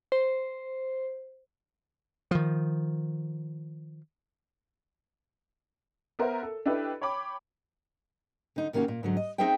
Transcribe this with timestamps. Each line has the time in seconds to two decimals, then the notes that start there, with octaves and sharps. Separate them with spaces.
0.12 C5
2.31 D#3 F3
6.19 B3 A#4 C5 E5
6.43 A4
6.66 D4 E4 G4 A4 B4 D#5
7.02 C#5 G5 B5 D6
8.56 D3 D#4
8.73 C3 D#3 A#3 C#4 F#4
8.88 A#2
9.03 G#2 D3 F#3
9.17 D#5
9.38 C4 D#4 G#4 C5 E5 G5